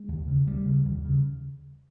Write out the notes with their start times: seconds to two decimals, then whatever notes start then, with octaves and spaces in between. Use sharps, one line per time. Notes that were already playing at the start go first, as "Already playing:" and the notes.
Already playing: G#3
0.08 D#2
0.27 C#3
0.47 D2 G3
0.66 C#3
0.85 D#2
1.05 C#3